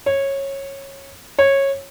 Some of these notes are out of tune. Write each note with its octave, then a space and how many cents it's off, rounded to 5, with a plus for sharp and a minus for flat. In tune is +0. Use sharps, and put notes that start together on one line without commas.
C#5 -15
C#5 -15